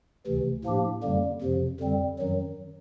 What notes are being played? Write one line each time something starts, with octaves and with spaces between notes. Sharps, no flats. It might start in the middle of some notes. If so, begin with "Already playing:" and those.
D2 C3 E3
A2 F3 A#3 D4 G4
F#2 D3 G3 A#3
F2 C3 F3
F2 D3 G3 C4
F#2 D#3 F#3